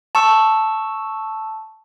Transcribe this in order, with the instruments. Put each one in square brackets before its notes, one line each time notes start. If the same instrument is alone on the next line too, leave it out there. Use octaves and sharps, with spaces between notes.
[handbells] A5 C#6 E6